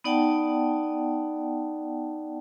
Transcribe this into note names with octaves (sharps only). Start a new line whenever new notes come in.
B3 D#4 D5 F#5 G5 A5